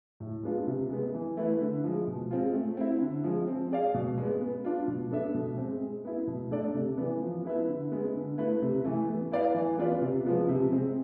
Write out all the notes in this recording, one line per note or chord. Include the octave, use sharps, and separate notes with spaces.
A2
G#3 B3 D4 F4
C3
G#3 B3
E3
A3 E4 B4
D3
F3 G#3
B2
G#3 C4 F4
A3
C4 E4
D3
F3 G#3
C4
G#4 D5 F5
B2
G#3 B3
B3
D4 F4
B2
B3 D4 A4 E5
B2
G#3 C4
G#3
B3 E4
B2
A3 D4 A4 D5
C3
E3 B3
F3
B3 E4 B4 E5
D3
G#3 B3
D3
A3 E4 B4
C3
E3 A3
B3
E4 B4 D5 F5
E3
B3 F4 B4 D5
C3
F3 G#3 B3 F4
C3
G#3 C4